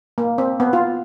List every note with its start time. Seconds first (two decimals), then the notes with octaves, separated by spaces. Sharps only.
0.18 A#3
0.38 C4
0.60 B3
0.73 F4